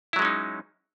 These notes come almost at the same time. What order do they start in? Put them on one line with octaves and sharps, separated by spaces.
E4 F#3 G#3 C#4 D#4